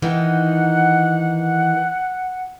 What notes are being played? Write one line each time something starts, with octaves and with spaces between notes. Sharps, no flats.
D#3 E3 D#4 F#5